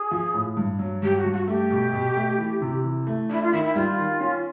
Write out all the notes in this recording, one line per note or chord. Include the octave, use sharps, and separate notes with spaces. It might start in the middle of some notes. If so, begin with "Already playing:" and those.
Already playing: G#4
F3
A2
G2
F#3
G2 G4
F#4
G2
F#4
A3 G4
B2
B2
A3
E3
C3
E3
A3
D4 E4
F4
D#3 E4
E4
G3 F4
D#3
C#4